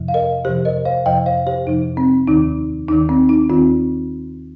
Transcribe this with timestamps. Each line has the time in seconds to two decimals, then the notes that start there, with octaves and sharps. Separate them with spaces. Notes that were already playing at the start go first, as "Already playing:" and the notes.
Already playing: F2 C3 F3
0.08 F5
0.14 A#4 D#5
0.45 F2 C3 F3 G4 C5
0.65 A#4 D#5
0.85 C5 F5
1.06 F2 C3 F3 D#5 G5
1.26 C5 F5
1.47 G4 C5
1.67 F2 C3 F3 D#4
1.97 C4
2.28 D#2 D#3 D#4
2.89 D#2 D#3 D#4
3.09 C4
3.29 D#4
3.50 D#2 D#3 C4 F4